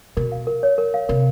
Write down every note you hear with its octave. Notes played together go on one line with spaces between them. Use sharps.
B2 A#4
F5
A#4
C#5
A#4
F5
C3 A#4